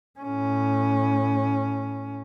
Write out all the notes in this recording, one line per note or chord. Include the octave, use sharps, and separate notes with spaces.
A2 C#4